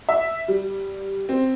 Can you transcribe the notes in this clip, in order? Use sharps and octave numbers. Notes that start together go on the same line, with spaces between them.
E5
G3
C4